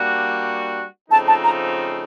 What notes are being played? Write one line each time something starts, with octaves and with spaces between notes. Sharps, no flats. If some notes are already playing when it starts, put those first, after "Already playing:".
Already playing: G3 A#3 D4 F#4
C#3 F3 A3 C4 D#4 A5
A5
A#5